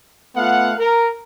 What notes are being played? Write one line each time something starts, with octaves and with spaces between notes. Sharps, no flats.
A3 B3 F4 F5 F#5
A#4